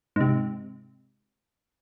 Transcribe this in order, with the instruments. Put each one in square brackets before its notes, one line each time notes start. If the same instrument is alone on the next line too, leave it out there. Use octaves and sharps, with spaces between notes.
[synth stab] G#2 C3